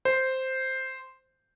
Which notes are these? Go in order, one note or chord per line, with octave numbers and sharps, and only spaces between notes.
C5